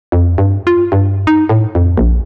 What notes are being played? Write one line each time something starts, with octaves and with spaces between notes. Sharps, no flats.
F2
G2
F4
G2
D#4
A2
F2
A#1